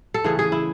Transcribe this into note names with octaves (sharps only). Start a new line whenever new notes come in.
A4
C#3 E3 A3 G#4
G#4
E4